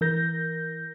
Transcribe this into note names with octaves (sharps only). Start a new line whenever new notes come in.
E3 A#4 G6 A#6